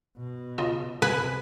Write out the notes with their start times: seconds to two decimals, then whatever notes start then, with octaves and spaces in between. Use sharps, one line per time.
0.18 B2
0.58 C#3 F4 D#5
1.02 C3 B4 G#5